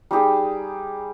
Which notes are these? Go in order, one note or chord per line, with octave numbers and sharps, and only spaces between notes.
G3 D#4 G4 G#4